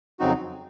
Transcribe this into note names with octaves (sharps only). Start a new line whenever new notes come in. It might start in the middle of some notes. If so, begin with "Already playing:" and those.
F2 C#3 F#3 C4 D#4 F#4